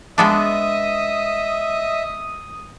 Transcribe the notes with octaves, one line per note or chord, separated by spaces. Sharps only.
G#3 B3 D4 D#5 E5 D#6